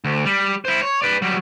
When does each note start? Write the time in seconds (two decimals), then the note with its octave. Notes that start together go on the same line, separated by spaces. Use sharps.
0.05 D2
0.25 G3
0.65 E4 C5
0.82 C#5
1.02 B4 D5
1.22 F#3 G3